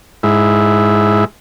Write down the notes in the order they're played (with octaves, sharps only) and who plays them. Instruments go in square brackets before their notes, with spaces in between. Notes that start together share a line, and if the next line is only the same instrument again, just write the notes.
[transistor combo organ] G#2 E4